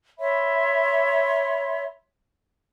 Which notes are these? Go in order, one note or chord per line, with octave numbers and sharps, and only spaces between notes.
C#5 E5 B5 C6